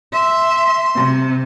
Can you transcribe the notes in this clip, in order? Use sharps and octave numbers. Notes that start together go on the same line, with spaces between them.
E5 C6
C3